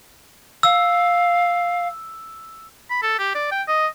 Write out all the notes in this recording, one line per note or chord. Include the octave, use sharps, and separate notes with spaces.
F5 E6
B5
A4
G4
D5
G5
D#5